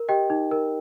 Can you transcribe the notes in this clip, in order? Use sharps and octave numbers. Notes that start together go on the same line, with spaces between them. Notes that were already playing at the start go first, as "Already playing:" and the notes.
Already playing: A#4
G4 D#5 G5
D#4
A#4